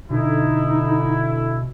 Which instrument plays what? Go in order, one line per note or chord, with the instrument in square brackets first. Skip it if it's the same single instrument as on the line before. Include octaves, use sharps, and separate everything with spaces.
[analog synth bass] B2 [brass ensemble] D3 E4 [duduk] D#4